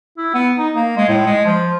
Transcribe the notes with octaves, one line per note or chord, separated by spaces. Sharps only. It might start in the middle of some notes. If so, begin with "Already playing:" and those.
E4
B3
D#4
A#3
G#3
A2
G#3
F3